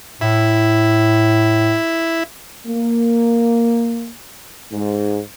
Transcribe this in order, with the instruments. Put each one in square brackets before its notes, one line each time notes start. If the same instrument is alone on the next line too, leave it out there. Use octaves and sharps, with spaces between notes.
[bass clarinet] A2 [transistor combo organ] E4
[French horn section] A#3
G#2